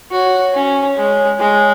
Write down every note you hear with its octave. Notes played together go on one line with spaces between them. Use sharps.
F#4 C#5
C#4
G#3
G#3